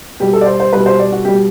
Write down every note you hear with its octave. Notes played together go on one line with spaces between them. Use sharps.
B2 G3 G4
A4
D5
C5
C5
B2 G3 B4
C5
D5
F#4
B2 G3 G4